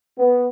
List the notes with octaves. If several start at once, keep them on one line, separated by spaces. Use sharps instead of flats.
B3